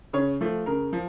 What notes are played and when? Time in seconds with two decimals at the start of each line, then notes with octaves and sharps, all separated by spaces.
0.13 C#3 C#5
0.41 F3 A3
0.66 C#3 A#4
0.93 F3